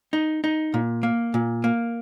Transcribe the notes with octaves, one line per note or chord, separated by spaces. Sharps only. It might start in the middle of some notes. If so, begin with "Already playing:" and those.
D#4
D#4
A#2
A#3
A#2
A#3